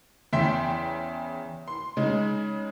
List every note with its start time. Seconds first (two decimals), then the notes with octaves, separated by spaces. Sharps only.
0.33 E2 C#3 E5 G5 C6 B6
1.68 C6
1.97 C#3 G#3 D#4